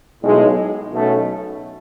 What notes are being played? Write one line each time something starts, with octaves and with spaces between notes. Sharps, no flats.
B1 A2 G#3
B1 B2 A3 C#4